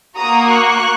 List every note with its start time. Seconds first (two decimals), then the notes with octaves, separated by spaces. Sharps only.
0.16 A#3 F#4 A#5 D#6
0.50 C#6 F#6